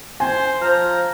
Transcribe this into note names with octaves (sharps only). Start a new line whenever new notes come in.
C5 G#5
F3 A#5 F6 G6